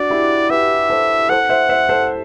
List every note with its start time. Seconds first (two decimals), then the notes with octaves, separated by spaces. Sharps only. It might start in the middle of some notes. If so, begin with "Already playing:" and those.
Already playing: D4 F#4 D5
0.10 E4 G4
0.49 G4 B4 E5
0.90 A4 C5
1.29 A4 C5 F#5
1.49 C5 E5
1.69 C5 E5
1.89 A4 C5